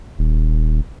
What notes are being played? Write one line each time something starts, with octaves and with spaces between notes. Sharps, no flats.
D#1